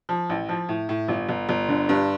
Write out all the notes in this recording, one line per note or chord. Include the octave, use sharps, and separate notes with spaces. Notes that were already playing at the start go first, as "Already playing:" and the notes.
F3
A1
F3
A2
A2
G1
G1
G1
D3
G2